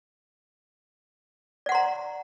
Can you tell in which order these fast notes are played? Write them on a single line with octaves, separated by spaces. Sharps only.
D5 F#5 C6 A#5